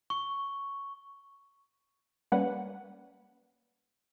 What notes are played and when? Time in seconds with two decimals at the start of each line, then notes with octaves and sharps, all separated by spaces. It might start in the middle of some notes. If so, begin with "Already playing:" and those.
0.10 C#6
2.32 G3 A#3 C#4 B4 F#5